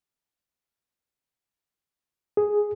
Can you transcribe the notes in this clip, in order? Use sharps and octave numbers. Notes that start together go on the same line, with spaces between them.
G#4